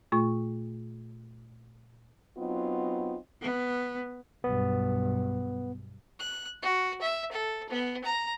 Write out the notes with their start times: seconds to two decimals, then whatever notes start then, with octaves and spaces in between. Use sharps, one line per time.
0.12 A#2 A3 F4 C#6
2.37 F#3 B3 C4 D#4 F4
3.41 B3
4.44 B1 G2 B3
6.19 F#6
6.62 F#4
7.01 E5
7.31 A4
7.69 B3
8.04 A#5